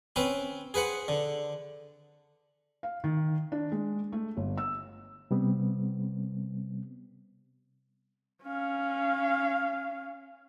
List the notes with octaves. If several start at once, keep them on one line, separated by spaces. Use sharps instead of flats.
C4 C#4 B4 C5
G#4 B4 C5 F#5
D3
F5
D#3
D4
G#3
A3
G1
E6
C3 G3 B3 C4
C#4 F5